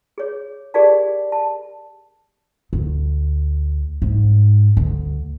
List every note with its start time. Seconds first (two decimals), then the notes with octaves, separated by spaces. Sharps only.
0.18 G#4 C#5
0.74 G4 G#4 A#4 D5 F5 A5
1.32 A5
2.73 D2
4.02 G#2
4.77 D2